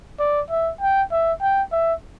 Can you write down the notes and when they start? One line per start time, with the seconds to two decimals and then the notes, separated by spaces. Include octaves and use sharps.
0.19 D5
0.50 E5
0.81 G5
1.12 E5
1.41 G5
1.72 E5